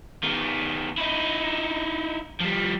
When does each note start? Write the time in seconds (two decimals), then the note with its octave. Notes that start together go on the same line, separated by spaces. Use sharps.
0.23 D#3 B3
0.98 D#4 E4
2.41 F3 G3